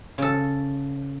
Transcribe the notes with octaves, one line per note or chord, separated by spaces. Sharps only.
C#3 A4